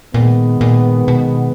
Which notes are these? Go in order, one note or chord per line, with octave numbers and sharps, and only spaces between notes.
A#2 D#3 G#3 B3
A#2
B2